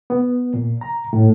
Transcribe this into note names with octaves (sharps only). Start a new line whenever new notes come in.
B3
A#2
A#5
A2